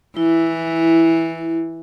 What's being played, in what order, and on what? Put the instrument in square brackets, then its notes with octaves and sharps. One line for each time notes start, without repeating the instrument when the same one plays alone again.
[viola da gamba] E3 [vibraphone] E4